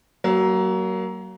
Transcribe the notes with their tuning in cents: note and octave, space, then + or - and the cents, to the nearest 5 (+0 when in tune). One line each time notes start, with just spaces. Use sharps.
F#3 +25 A#3 +0